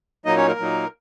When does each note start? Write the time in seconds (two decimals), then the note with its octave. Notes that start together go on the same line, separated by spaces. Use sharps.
0.25 A#2 F#3 A#3 D#4 D#5
0.36 C#4 C#5
0.48 A#3 A#4
0.59 A#2 F#3 A#3 D#4